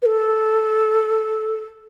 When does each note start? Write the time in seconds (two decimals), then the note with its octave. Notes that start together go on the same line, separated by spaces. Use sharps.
0.02 B4
0.05 A4